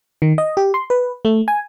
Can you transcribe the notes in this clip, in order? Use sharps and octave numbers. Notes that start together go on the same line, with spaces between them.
D#3
D#5
G4
C6
B4
A3
G#5